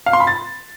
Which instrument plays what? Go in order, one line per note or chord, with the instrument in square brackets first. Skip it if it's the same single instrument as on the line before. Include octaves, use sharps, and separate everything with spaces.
[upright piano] F5
C6
B5
A6